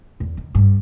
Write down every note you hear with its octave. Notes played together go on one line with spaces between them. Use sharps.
E2
D#3
G2